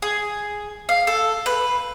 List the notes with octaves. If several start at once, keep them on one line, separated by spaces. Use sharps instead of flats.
G#4
F5
A4
B4